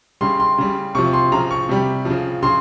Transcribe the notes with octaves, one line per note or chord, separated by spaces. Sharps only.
C#3 G3 C6
C6
C#3 G3
C3 F3 C#6
C6
C#3 F3 A#5
C#6
C3 G3
C#3 F3
C#3 C6